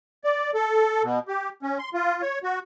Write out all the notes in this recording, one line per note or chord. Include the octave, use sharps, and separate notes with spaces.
D5
A4
B2
G4
C#4
C6
F4
C#5
F#4